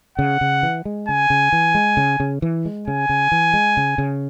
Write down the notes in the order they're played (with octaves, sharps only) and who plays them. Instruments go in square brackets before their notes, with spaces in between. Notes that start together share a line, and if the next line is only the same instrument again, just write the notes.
[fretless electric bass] C#3 [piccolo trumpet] F#5
[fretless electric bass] C#3
E3
G#3
[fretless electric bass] C#3 [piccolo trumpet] G#5
[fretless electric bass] C#3
E3
G#3
C#3
C#3
E3
G#3
[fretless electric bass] C#3 [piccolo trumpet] G#5
[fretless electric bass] C#3
E3
G#3
C#3
C#3